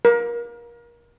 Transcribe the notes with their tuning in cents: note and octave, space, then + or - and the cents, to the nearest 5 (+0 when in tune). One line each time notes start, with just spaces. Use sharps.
A#4 +30